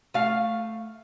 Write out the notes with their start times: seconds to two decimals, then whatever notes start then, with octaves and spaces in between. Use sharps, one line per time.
0.14 A3 F5